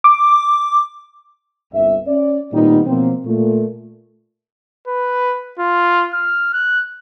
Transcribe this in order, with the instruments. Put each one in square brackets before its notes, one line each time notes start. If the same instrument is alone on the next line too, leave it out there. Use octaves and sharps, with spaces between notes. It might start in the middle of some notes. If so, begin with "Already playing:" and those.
[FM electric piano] D6
[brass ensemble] G1 C2 E5
C#4 D5
A#2 D#3 G3 B3 C4 D#4
B2 F3 F#3 A#3 C4
A#2 A3
[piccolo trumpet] B4
F4
F6
F#6